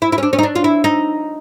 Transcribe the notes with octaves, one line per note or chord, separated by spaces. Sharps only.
E4
E4
C#4
D4
C#4
D#4
D4
F4
E4
D#4